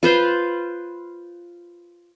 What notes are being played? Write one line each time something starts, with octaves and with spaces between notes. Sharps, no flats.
F4 B4 C5 F5